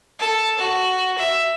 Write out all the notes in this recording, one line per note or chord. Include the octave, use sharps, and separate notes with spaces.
A4
F#4
E5